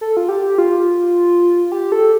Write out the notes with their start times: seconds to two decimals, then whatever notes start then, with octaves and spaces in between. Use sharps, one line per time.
0.01 A4
0.17 F4
0.29 G4
0.58 F4
1.72 G4
1.92 A4